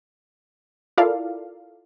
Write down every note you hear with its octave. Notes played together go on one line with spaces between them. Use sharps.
E4 F4 A4 A#4 D5 F5